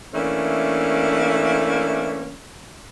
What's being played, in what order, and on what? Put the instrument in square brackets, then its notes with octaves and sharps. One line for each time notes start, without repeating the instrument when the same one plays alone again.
[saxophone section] E3 A3 A#3 C#4 D4